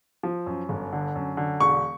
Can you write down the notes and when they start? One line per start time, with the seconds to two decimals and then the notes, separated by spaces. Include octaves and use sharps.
0.23 F3
0.46 F#2
0.69 G1
0.92 D3
1.15 F#2
1.37 D3
1.60 E1 C#6